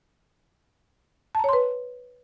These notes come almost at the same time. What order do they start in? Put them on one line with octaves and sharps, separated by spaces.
A5 A#5 C#5 C6 B4